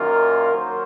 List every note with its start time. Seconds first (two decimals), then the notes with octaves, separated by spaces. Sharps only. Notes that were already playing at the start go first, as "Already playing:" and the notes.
Already playing: F#2 D#3 A#3 F4 A#4
0.54 F#3 A#3 C5